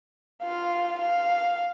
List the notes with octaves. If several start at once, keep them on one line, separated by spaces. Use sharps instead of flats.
F4 F5
F5